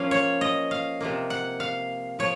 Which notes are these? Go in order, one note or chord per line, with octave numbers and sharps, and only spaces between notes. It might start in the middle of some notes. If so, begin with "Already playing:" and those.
Already playing: F3 A#3 C#4 F5
C#5
D#5
F5
C3 F3 A#3
F#5
F5
F3 C#5